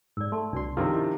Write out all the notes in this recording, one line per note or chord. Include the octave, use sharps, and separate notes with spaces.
G#2 D5 E6
A3 A5 C6
C2 D4 F#4 D5 C6
C3 D#3 F3 C#4 D4 F4
E4 D#5 E5